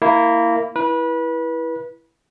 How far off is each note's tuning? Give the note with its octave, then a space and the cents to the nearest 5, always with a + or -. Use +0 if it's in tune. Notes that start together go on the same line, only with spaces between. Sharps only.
A#3 -15 E4 +0
E4 +0 B4 -25